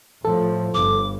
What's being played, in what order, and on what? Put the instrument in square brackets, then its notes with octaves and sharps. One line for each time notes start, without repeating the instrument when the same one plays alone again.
[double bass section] A2 F3 [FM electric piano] A4
[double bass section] G1 [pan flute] D6